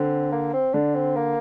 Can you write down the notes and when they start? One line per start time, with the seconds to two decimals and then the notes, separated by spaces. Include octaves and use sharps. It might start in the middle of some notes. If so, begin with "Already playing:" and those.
Already playing: D3 C4
0.32 A#3
0.53 C4
0.73 D3 D4
0.95 C4
1.16 A#3